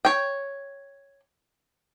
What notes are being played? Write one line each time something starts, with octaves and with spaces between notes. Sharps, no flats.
C#5 G5